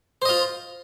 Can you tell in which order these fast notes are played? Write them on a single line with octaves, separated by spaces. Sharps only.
C5 D#5 F4